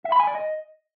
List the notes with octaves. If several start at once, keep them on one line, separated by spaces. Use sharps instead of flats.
E5
B5
G#5
D5
D#5